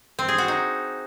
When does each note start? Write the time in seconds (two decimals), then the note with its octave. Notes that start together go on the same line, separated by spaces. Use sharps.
0.19 C4
0.28 G#4
0.38 F#4
0.48 D#4